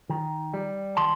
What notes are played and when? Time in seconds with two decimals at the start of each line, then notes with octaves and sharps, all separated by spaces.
0.10 D#3
0.54 G3
0.97 D#3 A5 C6